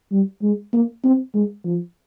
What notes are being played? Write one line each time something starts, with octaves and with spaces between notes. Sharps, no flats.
G3
G#3
A#3
C4
G#3
F3